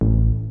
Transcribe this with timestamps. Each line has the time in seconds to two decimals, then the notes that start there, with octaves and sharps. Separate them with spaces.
0.01 A1